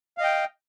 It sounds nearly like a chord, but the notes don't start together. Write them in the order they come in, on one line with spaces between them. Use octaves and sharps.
F5 D#5 G5